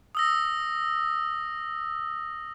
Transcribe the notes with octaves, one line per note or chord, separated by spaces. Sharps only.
D#6 E6 A#6